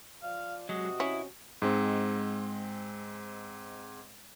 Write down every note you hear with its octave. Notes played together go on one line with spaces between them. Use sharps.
F3 F4 D5 F5
C3 F#3 G#3 F#4 D#5
C#4 E4
G#2 G#3 C4